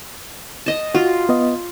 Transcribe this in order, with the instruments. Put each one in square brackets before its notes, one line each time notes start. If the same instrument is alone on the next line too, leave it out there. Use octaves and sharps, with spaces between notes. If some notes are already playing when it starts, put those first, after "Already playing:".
[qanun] D#5 A5
[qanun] F4 [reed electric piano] F#4
[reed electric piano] B3 D#5